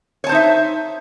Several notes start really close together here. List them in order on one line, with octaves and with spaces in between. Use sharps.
C#5 A5 C5 D#4 E5